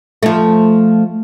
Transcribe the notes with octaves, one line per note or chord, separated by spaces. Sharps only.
F3 A3